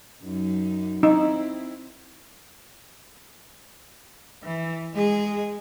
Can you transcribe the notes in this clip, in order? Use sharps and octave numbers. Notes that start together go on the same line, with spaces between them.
F#2 D#4
C4 D#4 E4
E3
G#3 G#4